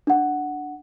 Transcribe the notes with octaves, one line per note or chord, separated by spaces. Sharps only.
D4 F#5